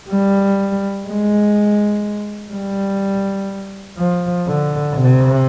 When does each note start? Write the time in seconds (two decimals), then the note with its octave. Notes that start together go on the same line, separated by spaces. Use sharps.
0.10 G3
1.08 G#3
2.53 G3
3.98 F3
4.47 D3
4.95 C3